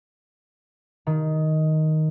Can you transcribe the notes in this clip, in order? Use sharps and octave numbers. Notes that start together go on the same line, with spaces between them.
D#3